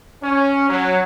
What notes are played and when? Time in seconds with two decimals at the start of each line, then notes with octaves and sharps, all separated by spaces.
0.23 C#4
0.70 F#3